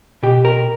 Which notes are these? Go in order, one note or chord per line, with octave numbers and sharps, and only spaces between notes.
B2 G4
A#4